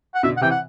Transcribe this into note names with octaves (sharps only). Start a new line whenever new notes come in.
F#5
B2 D3 E5
F#5
C3 E3 G5
F#5